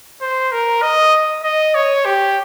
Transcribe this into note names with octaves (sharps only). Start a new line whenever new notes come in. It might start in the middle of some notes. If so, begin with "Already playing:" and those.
C5
A#4
D#5
D#5
C#5
G4